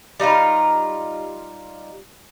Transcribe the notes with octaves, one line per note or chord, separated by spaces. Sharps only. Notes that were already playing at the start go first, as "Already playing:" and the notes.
G3 D#4 F4 A#4